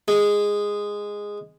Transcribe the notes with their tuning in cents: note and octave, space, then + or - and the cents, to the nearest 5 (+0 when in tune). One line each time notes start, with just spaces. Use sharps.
G#3 -10